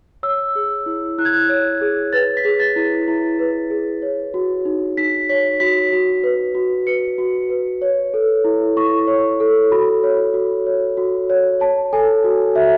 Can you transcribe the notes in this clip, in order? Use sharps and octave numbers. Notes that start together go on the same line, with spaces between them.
C#5 E6
G#4
E4
E4 F#6
G#6
F#6
C#5
G#4
B4 A6
B6
G#4
A6
E4
E4
B4
G#4
C#5
F#4
D#4
D#4 B6
C#5 B6
F#4 B6
F#4
B4
F#4
B4 C#7
F#4
B4
C#5
A4
E4
E4 C#6
C#5
A4
F#4 B5
C#5
F#4
C#5
F#4
C#5
C#5 A5
A4 G#5
F#4
F#4 E5